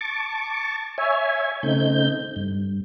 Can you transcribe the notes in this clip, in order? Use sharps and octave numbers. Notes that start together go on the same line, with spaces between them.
A5 C#6 D6
C#5 E5 G#5
C#3 A3 C4 D#4 G6
G2